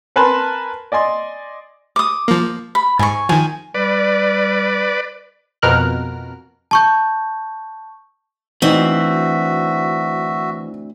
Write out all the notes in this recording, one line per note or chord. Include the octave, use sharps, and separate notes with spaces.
A#4 B4 G#5 A5 B5 C6
D5 D#5 G#5 C6
D6 D#6
F3 A#3
B5
G#2 G#5 C#6
D#3 F3 G#5
G3 B4 D5
F2 B2 A#4 F6 F#6
A5 C#6 G6
D2 E3 C4 D#4 F#4 E5